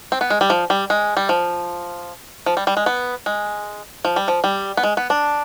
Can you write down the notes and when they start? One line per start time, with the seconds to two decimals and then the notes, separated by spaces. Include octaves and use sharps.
0.12 C4
0.21 B3
0.30 G#3
0.41 G3
0.50 F3
0.70 G3
0.90 G#3
1.17 G3
1.29 F3
2.46 F3
2.57 G3
2.67 G3
2.77 G#3
2.86 B3
3.26 G#3
4.05 F3
4.16 G3
4.28 F3
4.44 G3
4.77 B3
4.83 G#3
4.97 B3
5.10 D4